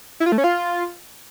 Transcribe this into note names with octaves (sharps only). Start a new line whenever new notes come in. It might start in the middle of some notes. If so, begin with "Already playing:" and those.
E4
F4
A3
C#4
F4